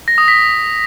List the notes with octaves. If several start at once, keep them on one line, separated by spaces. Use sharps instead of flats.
A#6
D#6
B6